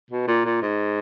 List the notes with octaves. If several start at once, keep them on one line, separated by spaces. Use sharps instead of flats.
B2
A#2
A#2
G#2